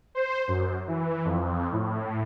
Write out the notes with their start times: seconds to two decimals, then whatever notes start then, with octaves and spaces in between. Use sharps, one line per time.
0.15 C5
0.48 F#2
0.88 E3
1.25 F2
1.72 A2